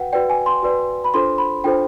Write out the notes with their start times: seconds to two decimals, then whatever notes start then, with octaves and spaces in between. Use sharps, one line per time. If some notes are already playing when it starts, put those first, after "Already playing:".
Already playing: F#4 B4 F#5 G5
0.13 F#4 B4 D5 G5
0.30 G#5
0.46 C6
0.63 F#4 B4 D5
1.04 B5
1.14 D4 F4 A4 C5 C6
1.38 B5
1.64 D4 F4 A4 C5 G5